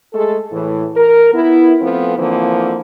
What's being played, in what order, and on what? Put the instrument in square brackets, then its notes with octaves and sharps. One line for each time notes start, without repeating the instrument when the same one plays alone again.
[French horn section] G#3 A3 G#4 A4
A2 E3
A#4
B3 E4
F3 A3 B3 C4
D3 E3 F3 A#3 C4